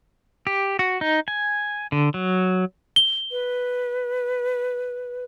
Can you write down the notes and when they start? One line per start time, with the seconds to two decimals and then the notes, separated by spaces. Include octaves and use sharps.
0.47 G4
0.79 F#4
1.01 D#4
1.28 G#5
1.92 D3
2.14 F#3
2.96 G7
3.31 B4